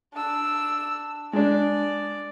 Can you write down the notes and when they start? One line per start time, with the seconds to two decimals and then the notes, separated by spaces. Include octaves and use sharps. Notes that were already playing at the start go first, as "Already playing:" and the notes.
0.13 D4 E6
1.33 G#3 D4 D5